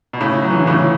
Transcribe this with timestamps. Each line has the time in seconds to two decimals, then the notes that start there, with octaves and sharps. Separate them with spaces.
0.13 B2
0.21 A2 C#3
0.42 F#3
0.50 E3
0.59 D3
0.66 A2 C#3